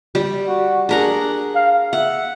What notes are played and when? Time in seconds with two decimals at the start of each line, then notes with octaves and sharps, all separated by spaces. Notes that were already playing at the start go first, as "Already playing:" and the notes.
0.15 G3
0.48 F#4
0.89 D4 G#4 A#4 F#5
1.55 F5
1.93 E5 F#5